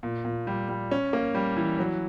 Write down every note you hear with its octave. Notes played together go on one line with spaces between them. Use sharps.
A#2
A#2
G3
G3
C#4
A#3
G3
E3
F#3